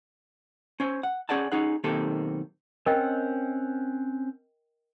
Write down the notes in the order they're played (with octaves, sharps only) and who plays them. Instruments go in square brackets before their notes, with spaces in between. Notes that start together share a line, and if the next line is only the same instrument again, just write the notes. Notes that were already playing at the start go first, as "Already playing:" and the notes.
[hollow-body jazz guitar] C#4 C5
F#5
C#4 G#4 D5 F#5 A5
C#4 D#4 G#4 F#5
B1 D#3 A#3 C4 G4 A4
[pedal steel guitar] C4 C#4 F#5 [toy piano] A#4 D#5 G5